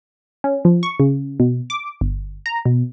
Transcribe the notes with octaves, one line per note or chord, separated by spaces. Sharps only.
C#4
F3
C#6
C#3
B2
D6
G1
A#5
B2